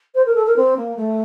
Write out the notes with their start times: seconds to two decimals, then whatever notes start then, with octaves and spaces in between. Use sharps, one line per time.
0.15 C5
0.25 A#4
0.34 A4
0.46 A#4
0.56 C4
0.76 A#3
0.96 A3